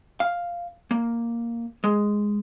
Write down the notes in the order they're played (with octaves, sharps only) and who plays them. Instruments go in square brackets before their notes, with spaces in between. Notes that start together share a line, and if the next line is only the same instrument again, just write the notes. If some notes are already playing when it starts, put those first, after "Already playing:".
[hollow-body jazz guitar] F5
A#3
G#3